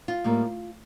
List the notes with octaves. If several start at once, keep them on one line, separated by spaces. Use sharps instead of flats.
F4
A2 G3 A#3